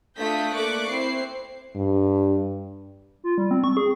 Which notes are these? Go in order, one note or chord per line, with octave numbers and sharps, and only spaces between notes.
A3 D4 F4 D#6 G6 B6
A3 A#3 D5 C#6 D6 F#6
C4 E4 C5 C7
G2
F4
G3
C4
C#6
G#4